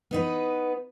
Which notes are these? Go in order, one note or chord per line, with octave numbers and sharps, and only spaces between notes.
B3 D#4 B4